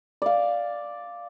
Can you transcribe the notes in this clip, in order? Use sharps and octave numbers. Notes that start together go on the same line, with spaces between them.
D5 F5